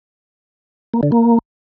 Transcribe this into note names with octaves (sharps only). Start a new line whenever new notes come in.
A#3
D3
A#3